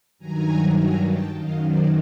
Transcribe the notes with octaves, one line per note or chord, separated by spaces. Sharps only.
G2 D#3 F#3 G#5 A#5
G#5 A#5
G5 A5
F#2 D#3 F#3 D#5 F5
C5 D5